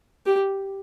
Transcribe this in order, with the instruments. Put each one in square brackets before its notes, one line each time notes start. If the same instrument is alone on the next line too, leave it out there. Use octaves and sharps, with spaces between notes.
[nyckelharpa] G4